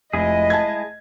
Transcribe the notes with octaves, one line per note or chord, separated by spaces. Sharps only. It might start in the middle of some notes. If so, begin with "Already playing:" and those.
F1 G#3 E4 G#4 D#5
A5 G#6